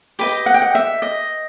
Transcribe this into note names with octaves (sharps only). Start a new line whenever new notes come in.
G4 B4 D#5 B5
F#5
G5
F#5
E5
D#5